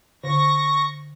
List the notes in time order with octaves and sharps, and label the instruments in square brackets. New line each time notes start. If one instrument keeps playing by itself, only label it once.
[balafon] D3 [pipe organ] C#6 A#6